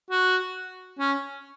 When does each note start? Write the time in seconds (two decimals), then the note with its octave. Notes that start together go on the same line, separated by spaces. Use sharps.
0.11 F#4
0.99 C#4